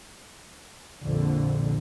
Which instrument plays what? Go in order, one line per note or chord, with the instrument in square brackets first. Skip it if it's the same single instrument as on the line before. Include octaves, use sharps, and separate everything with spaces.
[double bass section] A#1 F2 D3